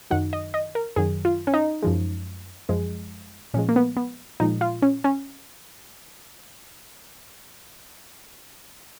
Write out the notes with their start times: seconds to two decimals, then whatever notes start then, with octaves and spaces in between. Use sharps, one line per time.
0.10 F#2 D#3 F#3 F#5
0.33 D#5
0.54 D#5
0.75 A#4
0.96 F#2 D#3 F#3 G#4
1.25 F4
1.47 C#4
1.54 D#4
1.83 F#2 F3 G#3
2.69 F#2 F3 G#3
3.54 A#2 F3 G#3 C#4
3.69 A#3
3.76 B3
3.96 B3
4.40 A#2 F3 G#3 D#4
4.61 F4
4.82 C#4
5.04 C#4